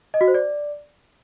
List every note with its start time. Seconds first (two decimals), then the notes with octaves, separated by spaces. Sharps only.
0.14 D#5
0.21 F#4
0.28 C5
0.34 D5